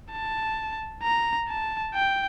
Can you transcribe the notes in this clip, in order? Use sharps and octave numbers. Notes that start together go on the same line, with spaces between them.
A5
A#5
A5
G5